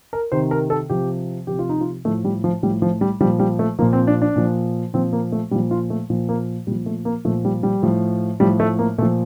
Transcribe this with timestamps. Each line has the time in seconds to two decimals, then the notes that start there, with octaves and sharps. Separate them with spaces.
0.13 A#4
0.32 C3 D#3 C5
0.51 A#4
0.70 A4
0.90 C3 F3 G4
1.47 C3 F3 G4
1.59 F4
1.69 D#4
1.81 F4
2.05 A2 F3 A3
2.24 G3
2.44 F3
2.63 A2 F3 G3
2.82 F3
3.01 G3
3.21 F3 G3
3.24 A#2
3.39 G3
3.59 A3
3.79 A#2 F3 A#3
3.93 C4
4.07 D4
4.22 D4
4.36 A#2 F3
4.93 A#2 F3 C4
5.13 A#3
5.32 A3
5.51 A#2 F3 G3
5.71 F4
5.90 A3
6.10 A#2 F3
6.29 A#3
6.67 A#2 G3
6.71 F3
6.86 A3
7.05 A#3
7.25 A#2 F3 A3
7.45 G3
7.63 G3
7.83 A2 F3
8.40 A2 F3 G3
8.60 A3
8.79 A#3
8.98 A#2 A3
9.02 F3